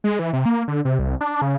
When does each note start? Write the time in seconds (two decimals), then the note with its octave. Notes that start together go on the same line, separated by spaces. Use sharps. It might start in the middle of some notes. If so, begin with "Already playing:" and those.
0.04 G#3
0.19 E3
0.33 C3
0.46 A#3
0.68 D3
0.85 C3
0.99 C2
1.21 D4
1.42 C#3